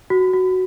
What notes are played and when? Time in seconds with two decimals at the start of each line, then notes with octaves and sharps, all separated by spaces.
0.10 F#4
0.33 F#4